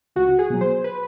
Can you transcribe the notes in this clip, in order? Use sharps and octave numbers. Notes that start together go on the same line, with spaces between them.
C#2 F#4
G#4
B2 F#3
C5
B4